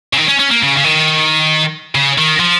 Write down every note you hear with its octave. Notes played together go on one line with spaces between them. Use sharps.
C#3
D#3
C#4
C#4
A#3
C#3
C#3
D#3
C#3
D#3
F3